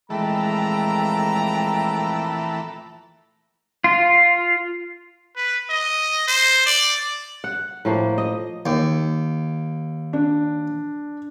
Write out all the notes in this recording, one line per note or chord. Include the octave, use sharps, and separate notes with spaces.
F2 A#2 E3 G#3 A3 G5 A#5
F4
B4
D#5
C5
D5
F#5
A2 F3 A#3
D#5
D#2
D4